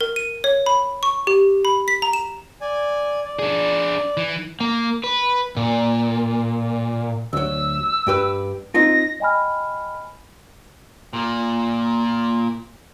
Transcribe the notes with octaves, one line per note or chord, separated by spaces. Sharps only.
A#4
D#7
C#5
B5
C#6
G4
B5
B6
A#5
E7
D5 G#5
D5
D4 G#4 D5
E3
A#3
B4
A#2
D2 F#3 E6
G2 G4 B4
C4 D#4 F4 A#6
D#5 G5 G#5 B5 F6
A#2 A#3